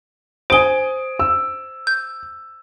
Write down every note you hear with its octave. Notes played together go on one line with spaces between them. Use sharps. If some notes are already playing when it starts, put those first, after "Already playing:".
C5 G#5 D#6 D7 G7
E6
G6